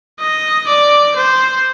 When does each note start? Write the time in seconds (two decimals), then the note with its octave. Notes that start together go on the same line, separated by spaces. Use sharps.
0.19 D#5
0.68 D5
1.16 C5